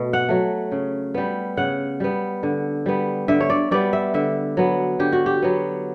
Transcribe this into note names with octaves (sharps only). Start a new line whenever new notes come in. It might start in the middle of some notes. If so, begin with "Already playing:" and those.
Already playing: B2 A3
F#5
F#3 A3
C#3
G3 B3
C#3 F#5
G3 B3
D3
G3 B3
D3 E5
C#5
D5
G3 B3 D5
E5
D3 E5
F#3 B3
D3 G4
F#4
G4
F#3 B3